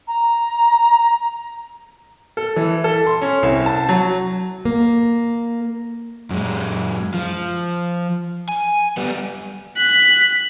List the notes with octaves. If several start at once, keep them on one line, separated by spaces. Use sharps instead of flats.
A#5
A4
E3
A4
C6
C#4
C2
A5
F#3
A#3
F#2 G#3
F3
G#5
G3 B3
F#6 B6